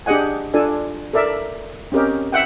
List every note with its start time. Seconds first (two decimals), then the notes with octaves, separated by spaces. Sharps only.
0.06 D4 G4 G#4 D#5 F#5 G#5
0.54 D4 F4 A4 D5 G#5
1.13 A4 A#4 D5 E5
1.92 C4 C#4 G4 A#4 D#5
2.32 E5 F#5 G5